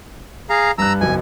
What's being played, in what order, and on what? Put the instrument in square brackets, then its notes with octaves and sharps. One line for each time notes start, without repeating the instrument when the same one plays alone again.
[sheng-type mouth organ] G#4 F5 A#5
[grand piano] G2 F#6 [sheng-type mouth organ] A#5 E6
[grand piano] F#1 B1 [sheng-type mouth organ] G#5